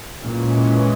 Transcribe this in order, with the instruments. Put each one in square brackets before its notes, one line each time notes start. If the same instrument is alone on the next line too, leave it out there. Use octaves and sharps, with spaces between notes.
[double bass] A#2 [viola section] E3 G#3 C#4